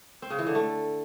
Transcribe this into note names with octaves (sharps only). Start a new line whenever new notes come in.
C4
C#3
E3
D3
A3